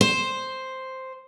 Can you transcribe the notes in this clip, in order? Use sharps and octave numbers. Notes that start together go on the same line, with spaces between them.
C5